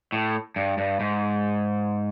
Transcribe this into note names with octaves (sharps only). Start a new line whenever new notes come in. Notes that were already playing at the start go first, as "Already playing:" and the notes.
A2
G2
G2
G#2